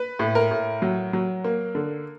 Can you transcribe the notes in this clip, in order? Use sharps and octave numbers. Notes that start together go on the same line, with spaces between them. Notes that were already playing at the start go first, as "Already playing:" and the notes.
Already playing: B4
A2
A#4
A2
F#3
F#3
A#3
D3